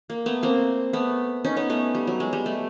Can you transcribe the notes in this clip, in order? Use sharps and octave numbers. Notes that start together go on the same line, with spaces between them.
A#3
A3 B3
A#3 C4
A3 B3
C#4 D#4
B3 C#4
A3 B3
G3
F#3
G#3
G3
A3